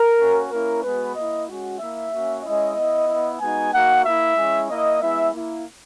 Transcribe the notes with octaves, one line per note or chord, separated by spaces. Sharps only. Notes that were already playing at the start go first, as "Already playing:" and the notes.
Already playing: A#4
A#3 C#4 F#4
A#3 C#4 E4 A#4
G#3 B3 F#4 B4
A#3 E4 D#5
G#3 C#4 F#4
A#3 E4 E5
A#3 C#4 F#4
G#3 C#4 E4 D#5
B3 E4
B3 E4
G#3 B3 D#4 F#4 G#5
A#3 D#4 F#4 F#5
A#3 E4 E5
G#3 C#4 E4
A#3 E4 D#5
G#3 B3 E4 E5
A#3 E4